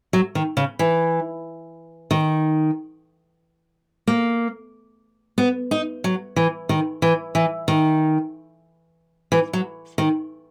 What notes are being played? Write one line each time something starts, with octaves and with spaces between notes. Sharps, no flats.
F#3
D#3
C#3
E3
D#3
A#3
B3
D#4
F#3
E3
D#3
E3
E3
D#3
E3
F#3
D#3